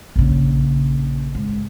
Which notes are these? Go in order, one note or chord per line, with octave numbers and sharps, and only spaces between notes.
A#1 C#3
G#2